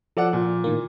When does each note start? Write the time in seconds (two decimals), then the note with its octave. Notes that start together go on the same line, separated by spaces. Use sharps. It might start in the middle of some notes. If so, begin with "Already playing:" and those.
0.17 F3 A4 D5 F#5
0.33 A#2
0.64 A2 D#3 A#3